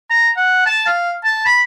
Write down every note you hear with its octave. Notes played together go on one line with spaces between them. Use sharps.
A#5
F#5
A5
F5
A5
B5